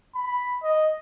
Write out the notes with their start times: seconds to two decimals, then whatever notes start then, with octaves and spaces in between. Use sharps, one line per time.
0.15 B5
0.63 D#5